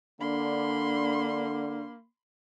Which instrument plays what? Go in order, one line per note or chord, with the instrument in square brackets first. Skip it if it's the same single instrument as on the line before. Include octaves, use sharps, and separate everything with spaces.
[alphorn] D3 [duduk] A#3 [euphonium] D4 [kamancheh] B5 C6